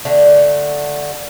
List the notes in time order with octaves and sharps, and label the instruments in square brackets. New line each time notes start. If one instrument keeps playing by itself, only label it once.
[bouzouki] D3 A3